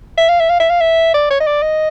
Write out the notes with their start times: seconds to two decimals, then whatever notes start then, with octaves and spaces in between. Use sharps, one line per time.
0.18 E5
0.29 F5
0.40 E5
0.49 F5
0.60 E5
0.70 F5
0.80 E5
1.14 D5
1.31 C#5
1.40 D#5
1.47 D5
1.62 D#5